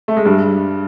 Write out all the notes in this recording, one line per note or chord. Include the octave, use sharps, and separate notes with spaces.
A3
G#3
G2 G3